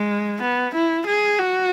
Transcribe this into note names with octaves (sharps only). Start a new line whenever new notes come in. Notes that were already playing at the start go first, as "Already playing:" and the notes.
Already playing: G#3
B3
E4
G#4
F#4